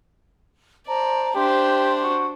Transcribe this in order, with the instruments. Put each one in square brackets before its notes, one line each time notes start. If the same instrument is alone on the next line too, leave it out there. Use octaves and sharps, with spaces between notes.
[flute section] C5 A5 A#5 [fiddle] D5
[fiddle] D4 C5 [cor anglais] G4 [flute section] E5 C6
[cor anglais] F#4